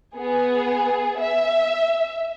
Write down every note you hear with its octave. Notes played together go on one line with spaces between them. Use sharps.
B3 G#4
E5